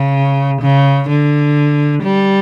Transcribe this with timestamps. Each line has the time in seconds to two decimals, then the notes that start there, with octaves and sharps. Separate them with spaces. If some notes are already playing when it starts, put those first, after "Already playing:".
Already playing: C#3
0.61 C#3
1.09 D3
2.03 G3